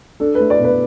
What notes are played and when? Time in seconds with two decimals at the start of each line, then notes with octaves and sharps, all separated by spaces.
0.20 D4 A4
0.35 A3 B4
0.50 D5
0.59 B2
0.64 B4